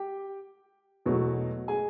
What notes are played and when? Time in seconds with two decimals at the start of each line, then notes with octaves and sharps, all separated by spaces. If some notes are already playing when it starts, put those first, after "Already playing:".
Already playing: G4 G5
1.06 E2 B2 F#3 A3
1.68 G#4 G#5